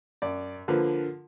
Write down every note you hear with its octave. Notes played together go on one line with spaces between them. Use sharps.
F#2 D5
D3 F3 A#3 B4